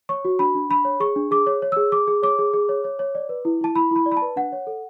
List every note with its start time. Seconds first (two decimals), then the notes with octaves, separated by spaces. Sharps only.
0.09 C#5 C#6
0.25 F#4
0.39 D4 B5
0.55 D4
0.70 D4 B5
0.85 C#5
1.00 G#4 C#6
1.16 D4
1.31 G#4 D6
1.47 C#5
1.62 C#5
1.72 G#4 E6
1.92 G#4 D6
2.07 G#4
2.23 C#5 D6
2.39 G#4
2.54 G#4
2.69 C#5
2.84 C#5
2.99 C#5
3.15 D5
3.29 B4
3.45 E4
3.61 E4 A5
3.75 E4 B5
3.91 E4 B5
4.06 D5
4.12 B5
4.17 A5
4.22 B4
4.36 D4 F#5
4.52 C#5
4.67 A4